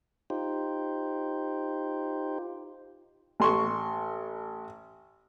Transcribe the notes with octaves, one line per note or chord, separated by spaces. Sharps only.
D#4 F4 G4 C5
A1 C6 C#6